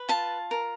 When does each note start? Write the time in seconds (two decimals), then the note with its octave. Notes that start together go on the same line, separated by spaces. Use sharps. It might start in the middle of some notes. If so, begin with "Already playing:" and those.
Already playing: B4
0.09 F4 A5
0.51 A#4